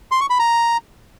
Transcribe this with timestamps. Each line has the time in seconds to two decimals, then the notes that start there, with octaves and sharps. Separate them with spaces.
0.11 C6
0.21 C#6
0.30 B5
0.39 A#5